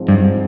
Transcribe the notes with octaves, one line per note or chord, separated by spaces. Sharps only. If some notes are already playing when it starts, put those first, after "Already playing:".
Already playing: G#2 F3 C4
G2